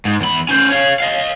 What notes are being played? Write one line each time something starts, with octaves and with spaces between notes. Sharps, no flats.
G#2
E2 B5
C#4 C5
C#5 F5
D#5 F5